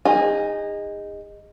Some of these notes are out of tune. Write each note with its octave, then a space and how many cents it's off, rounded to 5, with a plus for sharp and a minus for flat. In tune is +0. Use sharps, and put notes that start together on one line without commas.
D#4 +0 G#4 -35 G#5 +0